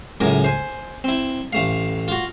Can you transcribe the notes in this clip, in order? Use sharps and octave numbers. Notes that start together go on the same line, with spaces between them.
C#2 F#2 A2 A#4 G#5 D#6
C5 G#5
C4 E4
A1 A3 F5
F4 F#4